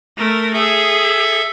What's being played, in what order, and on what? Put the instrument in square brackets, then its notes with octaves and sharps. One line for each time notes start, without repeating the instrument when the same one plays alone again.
[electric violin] A3 A#4
[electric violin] G#4 [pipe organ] A4 E5